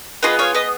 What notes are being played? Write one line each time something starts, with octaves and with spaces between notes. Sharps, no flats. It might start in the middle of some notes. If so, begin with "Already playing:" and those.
B3 F4 G#4 B4 D#5
C#5 F5
B4 D#5